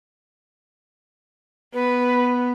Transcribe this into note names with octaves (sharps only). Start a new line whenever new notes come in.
B3 B4